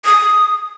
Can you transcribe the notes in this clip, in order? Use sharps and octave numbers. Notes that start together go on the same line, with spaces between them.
D#6